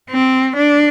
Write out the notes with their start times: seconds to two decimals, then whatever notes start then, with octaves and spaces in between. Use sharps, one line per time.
0.11 C4
0.57 D4